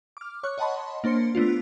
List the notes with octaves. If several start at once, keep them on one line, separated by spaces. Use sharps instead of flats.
D6 F6
C#5 C#6 F#6
C#5 D#5 F#5 A5 B5 C6
A#3 D4 C5 C6 C#7
A3 B3 D4 F4